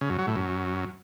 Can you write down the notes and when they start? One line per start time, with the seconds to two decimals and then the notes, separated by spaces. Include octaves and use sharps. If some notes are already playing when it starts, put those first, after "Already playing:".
0.01 C#3
0.10 F#2
0.19 F#3
0.27 A2
0.36 F#2